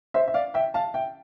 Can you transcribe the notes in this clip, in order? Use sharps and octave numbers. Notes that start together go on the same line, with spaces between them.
C5 E5
E5
D5 F5
E5 G5
F5 A5
E5 G5